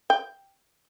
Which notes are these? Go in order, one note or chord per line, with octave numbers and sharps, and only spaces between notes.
G5